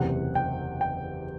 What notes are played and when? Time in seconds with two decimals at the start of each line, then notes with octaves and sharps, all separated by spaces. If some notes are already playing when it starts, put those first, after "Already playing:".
Already playing: F#1 E2 C3 F#5
0.35 G5
0.81 G5